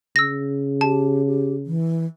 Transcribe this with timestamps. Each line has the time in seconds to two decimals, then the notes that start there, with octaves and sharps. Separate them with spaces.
0.16 C#3 E6 A#6
0.81 G4 A5
1.26 G4
1.66 E3